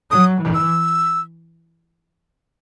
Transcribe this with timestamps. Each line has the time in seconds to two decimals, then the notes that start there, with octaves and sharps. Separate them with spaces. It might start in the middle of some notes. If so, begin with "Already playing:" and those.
0.10 F#3 D#6
0.40 E3
0.54 E6